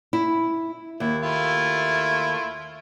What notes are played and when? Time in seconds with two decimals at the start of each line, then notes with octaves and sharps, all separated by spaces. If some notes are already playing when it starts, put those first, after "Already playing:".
0.13 E4
1.00 D#2 E4
1.23 A3 E4 F4